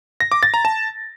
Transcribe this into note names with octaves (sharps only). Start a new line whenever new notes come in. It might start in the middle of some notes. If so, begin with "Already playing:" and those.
A#6
D6
A6
A#5
A5